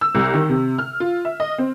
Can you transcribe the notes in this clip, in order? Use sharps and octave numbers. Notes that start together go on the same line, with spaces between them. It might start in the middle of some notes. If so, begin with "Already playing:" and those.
E6
C2
D#3
C3
F6
F4
E5
D#5
C4